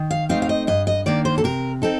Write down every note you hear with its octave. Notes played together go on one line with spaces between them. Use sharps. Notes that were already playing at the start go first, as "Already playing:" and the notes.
Already playing: D#3
F5
A3 C4 D#4 F5
F5
D#5
G2 D#5
D#5
D#3 A#3 D4 D5
C5
A4
C3 A#4
C4 D#4 A4